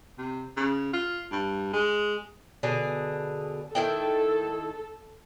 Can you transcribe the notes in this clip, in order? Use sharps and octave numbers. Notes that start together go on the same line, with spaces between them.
C3
C#3
F4
G2
G#3
B2 D3 G#4
D#3 E4 A4 G5